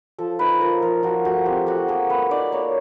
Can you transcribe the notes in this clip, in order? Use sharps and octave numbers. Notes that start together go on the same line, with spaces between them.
F3 A4
D#4 B4
F3 A#4
F3 A#4
F3 F#4
A3 F#4
C4 G4
A3 F#4
A#3 G#4
A#3 B4
D#4 D5
A#3 C#5